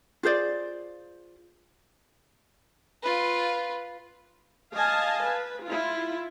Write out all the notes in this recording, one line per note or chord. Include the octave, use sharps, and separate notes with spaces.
F4 G#4 C5 D5
F4 B4
D#5 F5 G#5 A5
B4
E4 F4